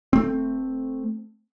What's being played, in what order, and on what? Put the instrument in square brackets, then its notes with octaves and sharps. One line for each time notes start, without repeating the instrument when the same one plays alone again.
[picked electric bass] A3 C4